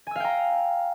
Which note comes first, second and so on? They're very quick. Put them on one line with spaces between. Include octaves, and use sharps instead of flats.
G#5 E6 F5 G5 A#5